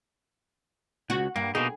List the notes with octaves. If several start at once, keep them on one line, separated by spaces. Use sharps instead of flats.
C#2 F#4
G2 A#3
B2 A#3 D#4 G#4